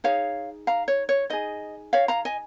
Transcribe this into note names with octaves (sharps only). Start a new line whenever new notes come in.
D#4 G#4 C#5 F5
F5 A#5
C#5
C#5
D#4 G#4 D#5
C#5 F5
F5 A#5
D#5 G#5